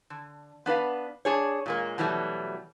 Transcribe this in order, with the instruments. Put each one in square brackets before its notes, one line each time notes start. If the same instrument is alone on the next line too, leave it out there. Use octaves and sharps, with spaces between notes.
[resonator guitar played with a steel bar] D3
B3 D4 B4 F5
D4 G#4 C#5
A#2 G#3 A#3
B2 E3 F#3 G3 A3